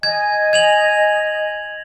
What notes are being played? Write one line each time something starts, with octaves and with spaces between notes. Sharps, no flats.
D#5 G#5 G#6
G#6 F7 F#7